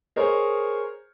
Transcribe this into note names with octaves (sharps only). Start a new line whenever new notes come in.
G#4 A#4 C5 C#5